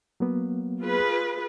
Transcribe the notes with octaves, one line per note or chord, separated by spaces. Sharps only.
F#3 A#3 B3
F4 G#4 B4